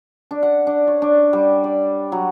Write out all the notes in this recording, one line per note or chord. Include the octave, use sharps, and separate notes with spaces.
D4
F#5
D4
C#5
D4
G3
D5
F#3